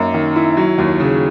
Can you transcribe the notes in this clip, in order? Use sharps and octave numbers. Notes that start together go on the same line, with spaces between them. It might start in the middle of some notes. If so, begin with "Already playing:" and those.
Already playing: F#2 A#3 D#4
D#3
E4
F#3
D#2
C#3